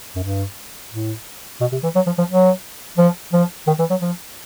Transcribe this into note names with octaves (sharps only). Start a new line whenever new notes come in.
F#2
G2
A2
B2
C3
E3
F#3
F3
F3
F#3
F3
F3
D#3
E3
F#3
F3